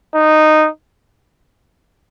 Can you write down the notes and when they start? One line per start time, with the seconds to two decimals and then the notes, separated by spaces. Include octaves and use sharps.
0.15 D#4